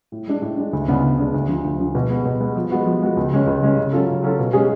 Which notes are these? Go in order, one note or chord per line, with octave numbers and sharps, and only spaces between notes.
A2
G#3 D4
A2
G#3 D4
D2
C#3 G#3 B3 D4
D2
C#3 G#3 B3 D4
D2
D3 F3
D2
D3 F3
B2
G#3 B3
B2
G#3 B3
F3
G#3 B3 F#4
F3
G#3 B3 F#4
C#2
C#3 G#3 C#4
C#2
C#3 G#3 C#4
C#3
F#3 C#4 F4 A4
C#3
F#3 C#4 F4 A4
B2
G#3 C#4 G#4